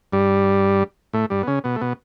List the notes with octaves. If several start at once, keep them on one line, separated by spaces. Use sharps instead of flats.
G2 G3
A2 A3
G2 G3
B3
C#3 C#4
B2 B3
A3
B2 B3